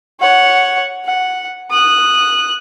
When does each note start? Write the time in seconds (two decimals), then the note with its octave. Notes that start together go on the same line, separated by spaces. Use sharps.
0.20 C#5 F#5
1.05 F#5
1.71 D#6 F#6